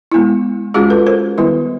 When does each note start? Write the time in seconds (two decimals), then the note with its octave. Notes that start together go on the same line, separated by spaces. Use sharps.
0.12 G#3 B3 E4
0.74 G#3 C#4 F4 F#4 G#4
0.90 A4 B4
1.07 A#4 C5
1.38 D#3 G3 B3 E4